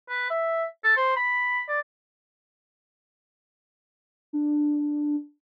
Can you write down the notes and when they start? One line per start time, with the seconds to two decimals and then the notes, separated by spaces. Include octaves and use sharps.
0.09 B4
0.30 E5
0.84 A4
0.97 C5
1.17 B5
1.68 D5
4.33 D4